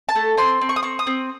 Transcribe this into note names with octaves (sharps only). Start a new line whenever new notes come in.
A5
A3
C4 C6
C4
C#6
D#6
C4 C#6
D#6
C4